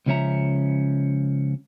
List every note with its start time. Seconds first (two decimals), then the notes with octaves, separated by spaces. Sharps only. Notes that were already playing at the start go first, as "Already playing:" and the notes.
0.06 C#2 C#3 F3 C#4 E5 A#5